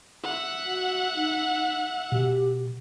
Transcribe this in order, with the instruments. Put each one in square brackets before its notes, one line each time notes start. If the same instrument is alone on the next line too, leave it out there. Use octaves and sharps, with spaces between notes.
[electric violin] E5 F#5
[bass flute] F#4
D#4
[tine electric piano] B2 [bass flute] G4